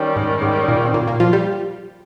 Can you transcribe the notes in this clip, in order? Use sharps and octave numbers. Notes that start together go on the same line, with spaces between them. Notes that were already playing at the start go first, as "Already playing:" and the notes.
Already playing: D#3 G3 C#4
G#2 G#3
G#2 G#3
A#2 A#3
C4
A#2 A#3
A#2 A#3
F3 F4
G3 G4